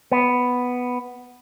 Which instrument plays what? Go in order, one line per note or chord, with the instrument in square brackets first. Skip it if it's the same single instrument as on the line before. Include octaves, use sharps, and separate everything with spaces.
[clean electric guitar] B3